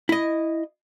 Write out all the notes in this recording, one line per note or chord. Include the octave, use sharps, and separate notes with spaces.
E4 D#5